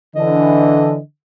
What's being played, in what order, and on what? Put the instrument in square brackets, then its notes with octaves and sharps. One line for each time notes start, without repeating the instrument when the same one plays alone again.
[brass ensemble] D3 E3 [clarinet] D#5